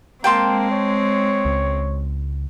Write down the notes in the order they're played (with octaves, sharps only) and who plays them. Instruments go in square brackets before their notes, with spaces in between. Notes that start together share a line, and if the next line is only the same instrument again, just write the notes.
[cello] G#3 C4 [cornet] A#3 [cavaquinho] G5 A5 C6
[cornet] C#5
[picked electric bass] C#2